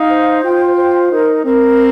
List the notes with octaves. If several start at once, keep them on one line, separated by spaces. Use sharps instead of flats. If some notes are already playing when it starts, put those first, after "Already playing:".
Already playing: D#4 F5
C5
F4 G5
C5
D#4 A#4
C4 A#4